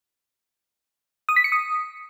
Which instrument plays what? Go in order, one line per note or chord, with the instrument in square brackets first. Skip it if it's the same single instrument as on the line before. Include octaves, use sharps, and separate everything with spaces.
[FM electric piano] D#6
B6
C#7
D#6